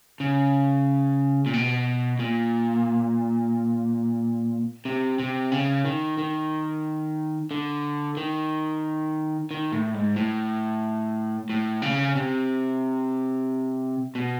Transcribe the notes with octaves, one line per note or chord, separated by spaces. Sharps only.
C#3
A#2
B2
A#2
C3
C3
C#3
D#3
D#3
D3
D#3
D#3
A2
G#2
A2
A2
C#3
C3
B2